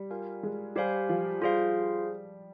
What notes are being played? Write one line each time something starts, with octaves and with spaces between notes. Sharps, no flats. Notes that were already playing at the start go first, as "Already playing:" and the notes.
Already playing: G3
F4 A#4 F5 G#5
G#3
G3 G4 C5 F5 G#5
F3
G3 F4 G#4 C5 F5